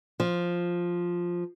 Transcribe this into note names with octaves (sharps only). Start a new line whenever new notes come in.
F3